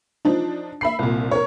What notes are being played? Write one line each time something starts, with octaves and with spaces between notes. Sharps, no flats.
F3 D4 D#4
E5 B5 C7
C2 A#2
A#4 C#5